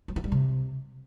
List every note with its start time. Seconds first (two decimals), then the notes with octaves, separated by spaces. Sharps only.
0.08 F#3
0.16 E3
0.24 G3
0.32 C3